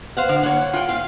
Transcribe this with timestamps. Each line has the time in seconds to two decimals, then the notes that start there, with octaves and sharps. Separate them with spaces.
0.17 C5 F5 F#5
0.29 D3
0.43 A#3 C#5 F#5
0.73 F4 F#5 G5
0.89 F5